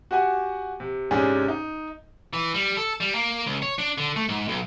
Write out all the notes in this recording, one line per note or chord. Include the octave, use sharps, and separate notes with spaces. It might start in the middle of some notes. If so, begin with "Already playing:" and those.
F#4 G4 F#5 G#5
C3
G#2 C3 C#4 D4 G#4
D#4
E3
G3
A4
G3
A#3
C#2
C#5
D4
D3
A3
G#2
B1